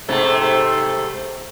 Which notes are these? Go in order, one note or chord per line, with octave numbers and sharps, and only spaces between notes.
G#2 C3 A3